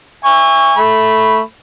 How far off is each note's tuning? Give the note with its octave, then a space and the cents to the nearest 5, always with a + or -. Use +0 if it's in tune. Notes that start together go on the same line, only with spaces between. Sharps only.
E5 +0 G#5 -35 C#6 +5
A3 +0 B5 +0